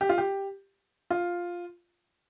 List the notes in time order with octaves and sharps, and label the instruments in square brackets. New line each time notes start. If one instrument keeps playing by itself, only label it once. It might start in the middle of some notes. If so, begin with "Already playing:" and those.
[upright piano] G4
F4
G4
F4